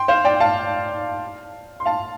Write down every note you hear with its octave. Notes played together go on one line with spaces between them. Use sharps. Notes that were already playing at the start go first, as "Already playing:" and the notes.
Already playing: G5 C6
C5 F5
D5 G5
F5 A5
C6
F5 A5